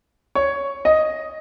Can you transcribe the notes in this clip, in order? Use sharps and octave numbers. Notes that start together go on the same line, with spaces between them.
C#5
D#5